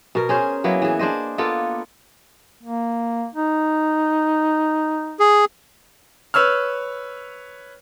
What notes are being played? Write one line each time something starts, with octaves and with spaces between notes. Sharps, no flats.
B2 A#4
C#4 G#4 C5
F#3 A#3 B3 E4
E3 G#4
D4 G#4 C5 D#5
A#3 B3 F4 A4
A#3
D#4
G#4
B4 C#5 E6 F6